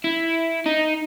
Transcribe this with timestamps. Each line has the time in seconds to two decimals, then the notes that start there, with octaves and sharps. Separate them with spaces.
0.04 E4
0.66 D#4